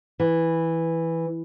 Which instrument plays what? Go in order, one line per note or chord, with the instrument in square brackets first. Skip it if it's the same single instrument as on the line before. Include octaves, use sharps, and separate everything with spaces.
[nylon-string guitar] E3